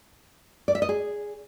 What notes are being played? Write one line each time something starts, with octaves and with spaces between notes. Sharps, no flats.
D5
E5
D#5
G#4